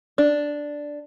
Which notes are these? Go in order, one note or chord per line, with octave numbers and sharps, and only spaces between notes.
D4